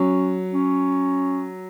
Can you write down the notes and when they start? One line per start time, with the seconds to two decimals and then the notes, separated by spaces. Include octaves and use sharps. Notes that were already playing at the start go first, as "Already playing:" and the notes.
Already playing: F#3 C#4
0.52 C#4